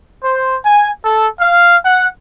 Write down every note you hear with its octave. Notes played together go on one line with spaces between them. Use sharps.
C5
G#5
A4
F5
F#5